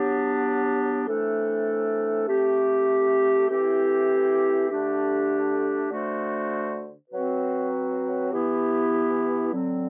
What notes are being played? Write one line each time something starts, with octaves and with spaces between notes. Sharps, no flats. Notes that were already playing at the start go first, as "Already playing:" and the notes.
Already playing: F#3 B3 D4 G4
C3 E3 A3 D4 A4
A3 C4 G4
E3 A3 C4 E4 G4
D3 A3 D4 G4
D3 A3 D4 F#4 C5
F#3 C4 F#4 B4
E3 B3 E4 G4
D3 F#3 C4